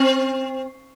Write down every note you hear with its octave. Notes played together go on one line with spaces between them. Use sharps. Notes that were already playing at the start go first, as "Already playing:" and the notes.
Already playing: C4